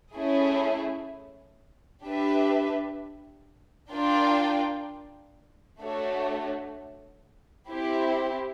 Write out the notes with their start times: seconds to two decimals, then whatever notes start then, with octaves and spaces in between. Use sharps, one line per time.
0.14 A3 C#4 E4 G#4
2.04 D4 G4 B4 E5
3.92 D4 F4 A#4 D5 G5
5.81 A3 D4 F#4 A4 C#5
7.70 C4 E4 G4